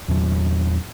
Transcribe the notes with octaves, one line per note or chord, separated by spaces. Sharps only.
E2 A#2 F#3